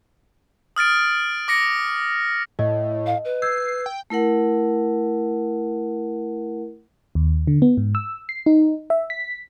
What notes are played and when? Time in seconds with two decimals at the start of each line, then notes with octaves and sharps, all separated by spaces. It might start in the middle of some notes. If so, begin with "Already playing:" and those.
0.76 D#6 F6 A6 D7
1.48 D6 A#6 C#7
2.59 A2 D#5
3.06 F5
3.25 B4
3.42 E6 G6 G#6 C7
3.86 G5
4.10 A3 E4 A#4 F#5
7.15 D#2
7.47 D3
7.62 B3
7.77 G#2
7.95 E6
8.29 C7
8.46 D#4
8.90 E5
9.10 B6